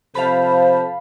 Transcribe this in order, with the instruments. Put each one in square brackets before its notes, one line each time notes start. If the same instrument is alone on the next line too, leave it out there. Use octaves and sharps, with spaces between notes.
[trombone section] C3 F3 A4 [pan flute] C5 [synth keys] F5 A5 B5